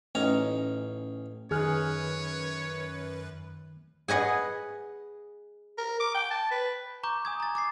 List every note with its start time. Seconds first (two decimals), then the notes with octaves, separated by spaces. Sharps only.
0.15 A1 C#4 D#4 A#5
1.51 F#2 D#3 G#4 B4 C#5 F6 F#6
4.08 G#4 B4 D#5 F#5
5.78 A#4
6.00 D6
6.15 G5
6.31 A5
6.51 B4
7.03 A#5 C#6 D6 G6
7.25 G#5 D#6 G#6
7.40 A#5 A6
7.55 D6 A6 C7